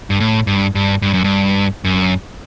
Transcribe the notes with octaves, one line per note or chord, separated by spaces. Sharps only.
G2
A2
G2
G2
G2
F#2
G2
F#2